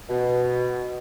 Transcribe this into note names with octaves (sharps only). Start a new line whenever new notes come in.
B2